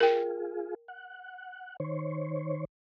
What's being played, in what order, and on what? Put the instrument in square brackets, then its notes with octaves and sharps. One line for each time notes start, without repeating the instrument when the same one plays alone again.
[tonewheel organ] F4 G#4 [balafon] A#4 G5
[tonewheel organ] F#5
D#3 C5 C#5